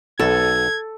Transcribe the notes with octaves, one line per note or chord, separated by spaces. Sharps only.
B1 B2 A4 G#6